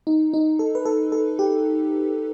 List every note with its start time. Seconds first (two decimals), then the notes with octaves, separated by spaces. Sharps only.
0.07 D#4
0.34 D#4
0.59 A4
0.75 B4
0.85 A4
1.12 A4
1.39 G4